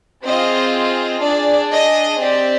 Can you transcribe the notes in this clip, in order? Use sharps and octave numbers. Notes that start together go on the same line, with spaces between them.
C4 F4 G#4 D#5
D#5
D4 G#4 D5
D#5
C4 G4 D5